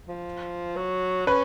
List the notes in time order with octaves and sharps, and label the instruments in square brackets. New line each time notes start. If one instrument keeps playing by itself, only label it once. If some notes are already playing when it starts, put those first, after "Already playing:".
[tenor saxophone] F3
F#3
[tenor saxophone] C#4 [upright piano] B4